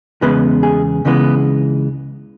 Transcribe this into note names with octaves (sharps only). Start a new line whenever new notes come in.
E2 C#3 G#3 B3 B4
G#4
C#2 C#3 E3 G#3 B3